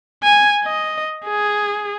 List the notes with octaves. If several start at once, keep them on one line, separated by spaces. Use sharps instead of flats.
G#5
D#5
G#4